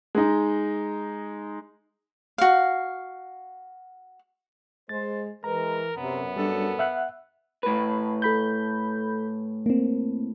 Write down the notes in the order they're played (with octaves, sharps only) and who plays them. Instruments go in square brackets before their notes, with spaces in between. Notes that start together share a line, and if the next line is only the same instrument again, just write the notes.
[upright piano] G#3 D#4
[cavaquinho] F#4 F5
[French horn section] G#3 [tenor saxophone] C5 [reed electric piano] A6
[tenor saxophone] E3 [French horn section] G#3 B4 [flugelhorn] A#4 [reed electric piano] A#5
[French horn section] F#2 [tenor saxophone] C3 [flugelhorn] B3
[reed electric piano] G3 D4 [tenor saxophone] A4
[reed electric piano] E5 F#5 F#6
[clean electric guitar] A2 B4
[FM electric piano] A4 B5 G6
A#3 C4